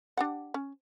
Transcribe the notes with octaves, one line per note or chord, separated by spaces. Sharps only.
D4 G4 F#5
C#4